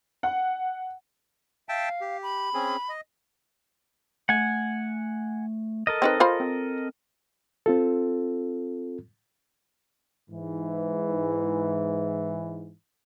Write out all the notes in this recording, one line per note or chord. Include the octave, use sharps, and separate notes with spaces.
F#5
E5 F5 G5 A5
G4
B5
C4 C#4 G#4
D#5
A3 F#5 G#5
A4 A#4 D#5
C4 D#4 B4
F4 C5 B5
C4
C4 F4 A4
G#2 E3